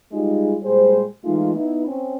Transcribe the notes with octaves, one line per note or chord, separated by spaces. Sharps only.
G3 G#3 D#4 F4 G4 G#4
A#2 G3 G#3 G#4 C5
E3 G#3 A3 D#4 F4
B3 D#4 E4
C4 C#4